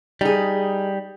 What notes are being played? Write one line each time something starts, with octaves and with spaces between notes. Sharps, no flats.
G3 D#4 G#4